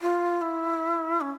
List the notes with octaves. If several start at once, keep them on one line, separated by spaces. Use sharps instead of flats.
F4
E4
C#4